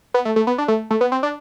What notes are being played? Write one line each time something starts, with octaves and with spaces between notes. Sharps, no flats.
B3
A3
A3
B3
D4
A3
A3
B3
C4
D4